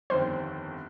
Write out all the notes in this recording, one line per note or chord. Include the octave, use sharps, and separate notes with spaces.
G1 F2 D#3 G3 C5